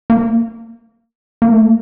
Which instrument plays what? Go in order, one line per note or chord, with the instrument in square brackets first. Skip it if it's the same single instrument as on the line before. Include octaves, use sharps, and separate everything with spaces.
[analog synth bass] A#3
A#3
A3